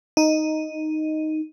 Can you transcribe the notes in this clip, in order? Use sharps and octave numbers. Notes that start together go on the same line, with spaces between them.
D#4